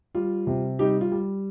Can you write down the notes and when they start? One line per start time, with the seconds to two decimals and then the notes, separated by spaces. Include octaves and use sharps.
0.15 G3 F4
0.47 C3
0.79 G3 D#4 G4
1.01 F4
1.12 G3